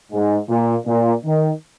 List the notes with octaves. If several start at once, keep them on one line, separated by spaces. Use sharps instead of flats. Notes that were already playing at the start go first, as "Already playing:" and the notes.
G#2
A#2
A#2
D#3